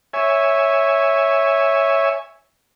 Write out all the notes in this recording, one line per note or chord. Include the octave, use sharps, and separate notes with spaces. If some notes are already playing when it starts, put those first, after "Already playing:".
C#5 E5 G#5